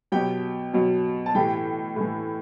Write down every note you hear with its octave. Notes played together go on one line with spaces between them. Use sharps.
B2 F#3 G4 G5
B2 F#3
A5
A2 E3 G4 G5
A2 E3